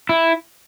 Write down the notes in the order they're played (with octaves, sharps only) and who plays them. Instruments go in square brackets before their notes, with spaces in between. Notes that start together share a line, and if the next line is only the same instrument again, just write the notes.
[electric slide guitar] E4